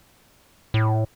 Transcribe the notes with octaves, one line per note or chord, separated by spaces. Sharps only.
A2